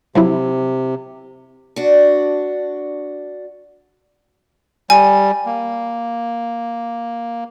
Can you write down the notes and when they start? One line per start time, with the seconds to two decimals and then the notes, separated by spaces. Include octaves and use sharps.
0.15 C3 F3 F#3 E4
1.76 D4 F#4
4.90 G3 G#5
5.46 A#3